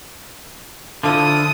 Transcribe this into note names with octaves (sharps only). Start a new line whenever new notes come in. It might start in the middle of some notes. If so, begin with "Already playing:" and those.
D3 F3 E4 F4 D#6